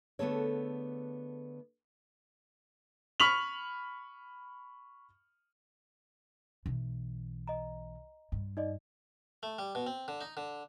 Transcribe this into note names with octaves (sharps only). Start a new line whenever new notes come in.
D3 A3 B3 G#4 A4 C#5
B5 C#6 F6 B6 F7 F#7
B1 E3
D#5 A#5
G2
D#4 D5 D#5
A3
G3
B2
C4
D3
D#4
D3